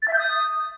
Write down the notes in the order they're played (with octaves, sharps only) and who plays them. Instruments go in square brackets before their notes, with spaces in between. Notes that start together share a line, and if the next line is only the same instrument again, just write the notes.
[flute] A6
E5
G6
D#6